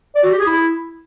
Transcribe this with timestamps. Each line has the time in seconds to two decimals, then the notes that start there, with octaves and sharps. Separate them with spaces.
0.16 D5
0.24 F#4
0.31 G4
0.39 G#4
0.47 E4